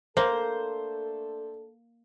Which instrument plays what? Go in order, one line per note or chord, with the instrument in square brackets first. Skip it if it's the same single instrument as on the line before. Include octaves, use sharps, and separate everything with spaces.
[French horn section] A3 D4 A4 [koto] A#3 [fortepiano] C5